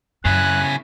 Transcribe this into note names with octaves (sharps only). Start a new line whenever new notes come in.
F#2 C#3 E4 G#5 F#6